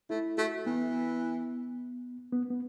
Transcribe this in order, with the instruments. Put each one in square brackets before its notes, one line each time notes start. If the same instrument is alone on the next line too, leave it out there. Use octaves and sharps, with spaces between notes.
[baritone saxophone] A3 [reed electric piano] E4
[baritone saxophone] A3 [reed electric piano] F#4
[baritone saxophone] E3 [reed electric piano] B3
[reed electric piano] B3
B3